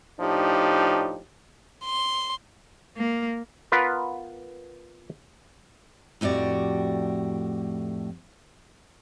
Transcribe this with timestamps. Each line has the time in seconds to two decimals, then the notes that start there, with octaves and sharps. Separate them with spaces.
0.20 A2 F3 D4 D#4 G4
1.85 C6
2.97 A#3
3.72 B3 F4 A#4 B4
6.21 F2 A2 F#4 G4 D5